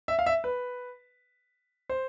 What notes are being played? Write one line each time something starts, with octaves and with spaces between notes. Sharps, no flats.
E5
F5
E5
B4
C5